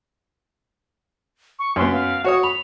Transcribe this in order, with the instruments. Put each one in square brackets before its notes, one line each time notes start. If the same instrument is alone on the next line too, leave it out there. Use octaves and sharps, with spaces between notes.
[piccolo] C#6
[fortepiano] F#2 B3 [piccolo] C6
[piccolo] F5
[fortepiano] F#4 C#5 D#6 [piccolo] C#6
[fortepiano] B5 [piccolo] F7